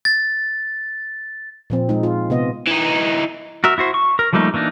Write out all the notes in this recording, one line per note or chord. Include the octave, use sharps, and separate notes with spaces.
A6
A#2 F3 C4
G#3 D#4
F4
C3 B3 D#5
E3 D#4
F#4 A#4 E5
E4 F#4 C5
C#6
A#4
F3 G3 A3 A#3 D#4
E3 A#3 D4 D#4